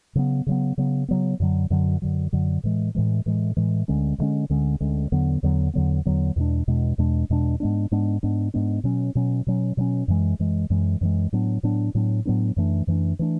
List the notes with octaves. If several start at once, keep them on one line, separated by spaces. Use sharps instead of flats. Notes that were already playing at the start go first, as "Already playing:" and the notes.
C#3 F#3 B3
C#3 F#3 B3
C#3 F#3 B3
C#3 F#3 B3
F#2 D3 F#3
F#2 D3 F#3
F#2 D3 F#3
F#2 D3 F#3
A2 E3 G#3
A2 E3 G#3
A2 E3 G#3
A2 E3 G#3
D2 D3 G#3 C#4
D2 D3 G#3 C#4
D2 D3 G#3 C#4
D2 D3 G#3 C#4
E2 D3 F#3 B3
E2 D3 F#3 B3
E2 D3 F#3 B3
E2 D3 F#3 B3
E2 B2 G#3 D4
E2 B2 G#3 D4
E2 B2 G#3 D4
E2 B2 G#3 D4
G#2 G#3 B3 D4
G#2 G#3 B3 D4
G#2 G#3 B3 D4
G#2 G#3 B3 D4
B2 F#3 C#4
B2 F#3 C#4
B2 F#3 C#4
B2 F#3 C#4
F#2 E3 G#3
F#2 E3 G#3
F#2 E3 G#3
F#2 E3 G#3
A2 F#3 B3 D4
A2 F#3 B3 D4
A2 F#3 B3 D4
A2 F#3 B3 D4
F#2 E3 A3 D4
F#2 E3 A3 D4
E3 A3 D4